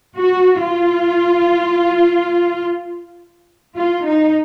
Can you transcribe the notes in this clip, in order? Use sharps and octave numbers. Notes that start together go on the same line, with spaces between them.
F#4
F4
F4
D#4